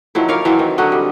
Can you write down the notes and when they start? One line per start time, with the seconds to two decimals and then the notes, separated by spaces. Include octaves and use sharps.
0.15 D#3 F3 F#3 E4
0.28 A#4 C#5 D5 F5
0.45 E3 F#3 C4
0.59 D#3
0.78 D3 F#3 F#4 D#5
0.92 G3